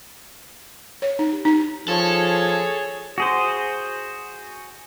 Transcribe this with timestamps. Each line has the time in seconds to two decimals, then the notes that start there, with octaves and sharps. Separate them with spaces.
1.02 C#5
1.19 D#4
1.33 G4
1.45 D#4
1.88 F3 G#4 A4 C#5
3.18 F#4 G#4 C5